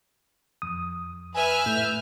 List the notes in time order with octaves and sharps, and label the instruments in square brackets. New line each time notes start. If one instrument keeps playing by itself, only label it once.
[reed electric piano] F2 D#6
[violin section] B4 E5 F6 [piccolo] G#5
[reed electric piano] A2 A3 [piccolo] G6